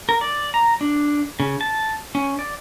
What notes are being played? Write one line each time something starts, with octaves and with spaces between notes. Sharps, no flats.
A#4
D5
A#5
D4
C#3
A5
C#4
D5